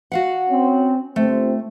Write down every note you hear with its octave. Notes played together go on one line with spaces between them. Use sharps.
F#4 F5 F#5
C4 C#4
G1 A3 C4